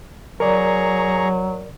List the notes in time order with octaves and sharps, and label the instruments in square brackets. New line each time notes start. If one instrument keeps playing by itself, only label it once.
[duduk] F#3 [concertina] G#4 A#5 C#6 [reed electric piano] A#4 D5